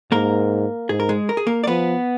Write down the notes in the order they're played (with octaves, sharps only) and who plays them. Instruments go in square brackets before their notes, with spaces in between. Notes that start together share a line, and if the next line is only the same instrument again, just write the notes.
[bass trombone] G#2 [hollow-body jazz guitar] A#3 A#4
[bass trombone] G#2 [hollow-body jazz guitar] G#4
[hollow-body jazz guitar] A#4
G#3 G#4
A#4
G#4
A#3 A#4
D5
[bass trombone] F3 [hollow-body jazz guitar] B3 B4